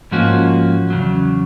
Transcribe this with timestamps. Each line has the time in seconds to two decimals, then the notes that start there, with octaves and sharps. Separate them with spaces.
0.11 G#2 F3 A#3 C#4 F#4
0.90 E2 C#3 F#3